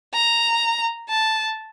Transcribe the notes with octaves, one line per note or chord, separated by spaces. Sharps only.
A#5
A5